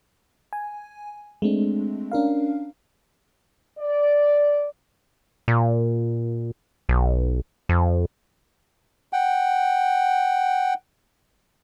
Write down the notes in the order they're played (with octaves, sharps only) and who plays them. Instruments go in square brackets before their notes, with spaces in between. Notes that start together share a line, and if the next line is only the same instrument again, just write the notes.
[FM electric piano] G#5
G#3 A3 C4 D4
C#4 D4 A#4 F5
[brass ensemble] D5
[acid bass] A#2
B1
F2
[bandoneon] F#5 G5